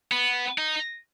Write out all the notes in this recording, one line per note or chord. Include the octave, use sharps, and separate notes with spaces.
B3
D#4